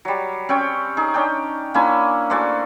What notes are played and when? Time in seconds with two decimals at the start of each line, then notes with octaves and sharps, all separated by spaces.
0.05 F#3 G3
0.49 C4 C#4 C#5 G5
0.97 D#4 G#4
1.14 C#4 D4 G5
1.74 A#3 C#4 D4 E4 G#5
2.30 A3 F#4 C5 D5 G#5